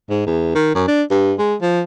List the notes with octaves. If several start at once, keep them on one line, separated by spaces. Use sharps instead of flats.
G#2
E2
D#3
F#2
D4
G2
G#3
F3